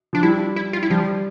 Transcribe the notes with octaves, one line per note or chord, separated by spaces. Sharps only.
F3 D4
G3 E4
E4
F4
E4
F3 G3